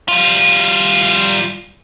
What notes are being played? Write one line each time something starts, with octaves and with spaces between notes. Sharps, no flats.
G3 F4